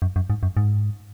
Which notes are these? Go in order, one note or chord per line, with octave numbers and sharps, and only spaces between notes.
F#2
F#2
G#2
F#2
G#2